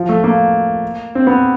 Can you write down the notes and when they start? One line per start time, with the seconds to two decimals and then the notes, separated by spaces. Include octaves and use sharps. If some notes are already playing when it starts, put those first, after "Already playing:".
Already playing: F3
0.09 A3
0.24 A#3
1.15 C4
1.27 B3